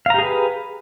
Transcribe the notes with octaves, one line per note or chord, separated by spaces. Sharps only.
G4 G#4 B4 F5 A#5